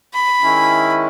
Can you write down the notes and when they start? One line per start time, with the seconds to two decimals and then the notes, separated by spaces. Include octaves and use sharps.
0.13 B5
0.41 D#3 G#3 C#4 E4